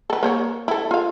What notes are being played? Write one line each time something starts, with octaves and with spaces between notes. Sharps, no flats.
A4 B4
A#3 C5 C#5
E4 A4
F4 F5